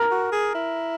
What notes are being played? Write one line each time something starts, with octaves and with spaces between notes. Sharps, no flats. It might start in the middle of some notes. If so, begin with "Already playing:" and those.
Already playing: A#4
F#4
G#4
E4